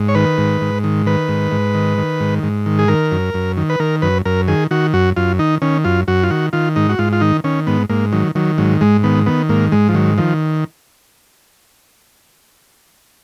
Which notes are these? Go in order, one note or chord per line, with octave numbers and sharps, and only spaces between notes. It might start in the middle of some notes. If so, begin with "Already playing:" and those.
Already playing: G#2
C#5
D#3 B4
G#2
G#2
D#3
D#3 B4
G#2
G#2
D#3
D#3
G#2
G#2
D#3
G#4
D#3 A#4
F#2
F#2
D#3
B4
D#3 A#4
F#2 B4
F#2 A#4
D#3 G#4
D#3 F#4
F#2 F#4
F#2 F4
D#3 D#4
D#3 C#4
F#2 F4
F#2 F#4
F4
D#3 F#4
D#3 F4
G#2 D#4
F#4
G#2 F4
F4
D#3 D#4
D#3 C#4
G#2 B3
G#2 A#3
D#3 F#3
D#3 F#3
G#2 F#3
G#2 G#3
D#3 B3
D#3 B3
G#2 A#3
G#2 G#3
F3
D#3 F#3
D#3 F3